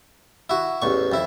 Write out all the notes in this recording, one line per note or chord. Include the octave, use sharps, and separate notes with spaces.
E4 F#4
A1 E2 C#6
F2 E4